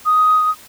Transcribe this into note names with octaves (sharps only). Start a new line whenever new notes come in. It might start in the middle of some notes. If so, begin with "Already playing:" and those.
D#6